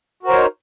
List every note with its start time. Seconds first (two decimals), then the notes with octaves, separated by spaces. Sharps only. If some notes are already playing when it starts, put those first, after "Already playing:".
0.23 F#4
0.25 A#4
0.28 C5
0.30 C#5
0.33 D#4